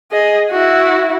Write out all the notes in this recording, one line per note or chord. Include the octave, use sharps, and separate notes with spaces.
G#4 D#5
E4 F#4